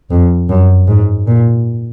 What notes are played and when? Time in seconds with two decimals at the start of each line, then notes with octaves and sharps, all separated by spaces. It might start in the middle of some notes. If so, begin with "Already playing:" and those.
0.10 F2
0.49 F#2
0.88 G#2
1.27 A#2